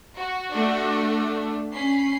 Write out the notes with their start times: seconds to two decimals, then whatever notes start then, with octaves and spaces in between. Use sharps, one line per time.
0.17 F#4
0.52 A3 D4
1.73 C#4 B5 C7